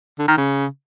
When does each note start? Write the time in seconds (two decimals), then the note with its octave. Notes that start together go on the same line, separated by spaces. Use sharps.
0.19 D3
0.28 D#3
0.38 C#3